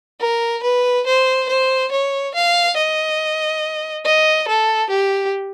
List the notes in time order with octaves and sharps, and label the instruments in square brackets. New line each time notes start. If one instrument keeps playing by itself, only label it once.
[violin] A#4
B4
C5
C5
C#5
F5
D#5
D#5
A4
G4